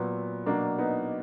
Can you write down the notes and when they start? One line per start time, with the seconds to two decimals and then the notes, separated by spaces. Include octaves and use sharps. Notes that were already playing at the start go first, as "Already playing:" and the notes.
Already playing: A#2 F#3 B3
0.46 B2 F#3 A#3 D4
0.78 B3 D#4